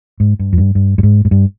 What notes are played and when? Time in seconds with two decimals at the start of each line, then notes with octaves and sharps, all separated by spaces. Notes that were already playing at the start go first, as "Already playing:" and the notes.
0.20 G#2
0.39 G2
0.53 F2
0.58 G2
0.75 G2
0.98 G2
1.03 G#2
1.25 G#2
1.31 G2